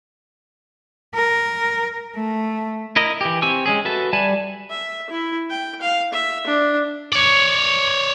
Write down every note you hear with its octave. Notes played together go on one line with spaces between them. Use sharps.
A#4
A3
E4 A#4 D#5
E3 G4
C4 G4 G#5 C#6 E6
G#3 C#4 G#4
F#4 A4 B4 E5 A5
G3 D5 G#5 A5 B5
E5
E4
G5
F5
E5
D4
C#5 D5